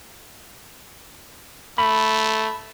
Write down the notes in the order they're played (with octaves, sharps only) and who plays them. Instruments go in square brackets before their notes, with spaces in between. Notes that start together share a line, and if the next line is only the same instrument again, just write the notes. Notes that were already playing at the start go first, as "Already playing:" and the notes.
[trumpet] A3 [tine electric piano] B5